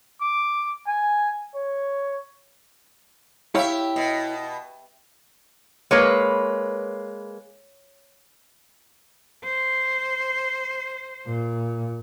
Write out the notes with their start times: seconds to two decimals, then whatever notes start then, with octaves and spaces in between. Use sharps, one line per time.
0.21 D6
0.87 G#5
1.55 C#5
3.55 E4 G4 C#5 E5 F5
3.96 B2
5.91 G#3 A#3 B4 C#5
9.43 C5
11.28 A#2